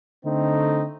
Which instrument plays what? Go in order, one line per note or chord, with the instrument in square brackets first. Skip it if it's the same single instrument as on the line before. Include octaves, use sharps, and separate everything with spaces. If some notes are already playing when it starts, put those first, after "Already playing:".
[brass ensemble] D3 A3 C4 D#4